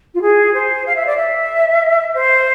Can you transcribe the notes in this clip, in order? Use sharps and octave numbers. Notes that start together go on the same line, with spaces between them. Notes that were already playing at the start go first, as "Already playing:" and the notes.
F4
G#4
C5
F5
E5
D5
E5
C5